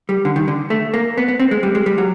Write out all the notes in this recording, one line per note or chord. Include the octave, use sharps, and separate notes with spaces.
G3
D3
D#3
D3
A3
A#3
B3
B3
C4
G#3
G3
G#3
G3
F#3